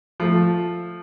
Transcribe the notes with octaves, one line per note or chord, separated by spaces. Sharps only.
F3 A3